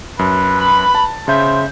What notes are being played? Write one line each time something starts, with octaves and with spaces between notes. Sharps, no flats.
F#2 B4
B5
A5
C#3 C5 E5 G6